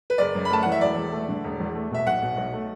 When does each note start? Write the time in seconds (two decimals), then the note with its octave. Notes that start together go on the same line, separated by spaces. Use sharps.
0.10 B4
0.18 F#1 D5
0.35 F#2
0.45 B5
0.51 A3 A5
0.63 E3 F#5
0.72 E5
0.81 E1 D5
0.96 E2
1.12 A3
1.29 D3
1.44 E1
1.60 E2
1.75 A3
1.91 B2 E5
2.06 B1 F#5
2.22 B2
2.37 B1
2.54 A3